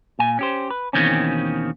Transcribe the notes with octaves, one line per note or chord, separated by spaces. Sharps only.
A#2 G#5
C#4 G4 C5
B4
D#2 B2 D#3 E3 C4 C#4